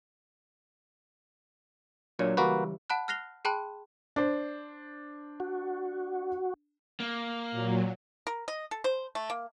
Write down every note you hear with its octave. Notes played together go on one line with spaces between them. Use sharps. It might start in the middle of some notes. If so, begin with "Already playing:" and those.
A#2 F#3 D4 C#5
C#2 E3 G3 A#3 F#4 B4
F#5 A5 B5 F#6
F6 F#6 A#6 C7 F7 G7
G#4 G5 A5 B5 C6 F#6
D4 C5
F#4
A#3
A#2 F#3
A#4
D#5
A4
C5
A3
A#3